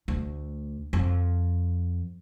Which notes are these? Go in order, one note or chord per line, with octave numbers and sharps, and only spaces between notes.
D2
F2